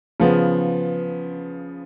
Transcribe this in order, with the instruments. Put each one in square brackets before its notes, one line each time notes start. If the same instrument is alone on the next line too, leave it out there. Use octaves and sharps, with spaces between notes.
[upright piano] C#3 F3 B3